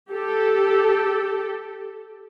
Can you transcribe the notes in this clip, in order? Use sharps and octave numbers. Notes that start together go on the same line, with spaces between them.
G4 A4